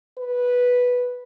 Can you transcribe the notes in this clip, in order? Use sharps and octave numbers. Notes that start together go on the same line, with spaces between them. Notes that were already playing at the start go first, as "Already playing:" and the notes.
B4